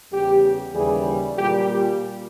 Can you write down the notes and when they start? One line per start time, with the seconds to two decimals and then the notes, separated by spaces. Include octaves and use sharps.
0.12 E2 C#3 G3 G4
0.75 D#2 C#3 E3 G3 G#4
1.38 A#2 G3 G4
1.70 G4